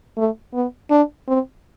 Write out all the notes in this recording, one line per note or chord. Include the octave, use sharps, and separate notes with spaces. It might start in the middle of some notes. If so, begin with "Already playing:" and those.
A3
B3
D4
C4